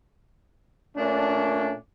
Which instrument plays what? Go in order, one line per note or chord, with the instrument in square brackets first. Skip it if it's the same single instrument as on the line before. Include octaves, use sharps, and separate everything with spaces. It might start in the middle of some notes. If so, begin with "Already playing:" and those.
[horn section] A#2 A3 C#4 D4